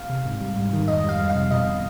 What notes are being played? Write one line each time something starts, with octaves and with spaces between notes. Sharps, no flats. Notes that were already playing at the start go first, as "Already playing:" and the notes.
Already playing: F5
C3
G#2
G3
G#2
D#3
F2 D#5
G3 F5
F2
F5
C3
B2 D#5
B2